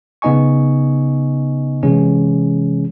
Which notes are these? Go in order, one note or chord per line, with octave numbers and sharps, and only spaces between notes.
C#3 B3 D#4 D#5 G#5 C#6
C3 E3 G#3 C#4 G#4